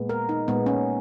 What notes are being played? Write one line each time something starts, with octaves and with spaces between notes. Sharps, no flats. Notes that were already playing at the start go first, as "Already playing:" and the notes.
Already playing: A#2 G#3 B3
A#4
D#4
A#2 G#3 B3
C#4